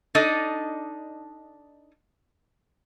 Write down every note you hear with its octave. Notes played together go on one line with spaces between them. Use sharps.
D4 D#4 A4 D5 D#5